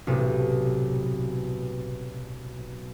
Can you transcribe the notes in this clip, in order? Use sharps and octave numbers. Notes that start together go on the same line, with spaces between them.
B1 A2 C3